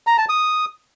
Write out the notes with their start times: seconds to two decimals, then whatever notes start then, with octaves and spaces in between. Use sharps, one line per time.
0.07 A#5
0.18 A5
0.29 D#6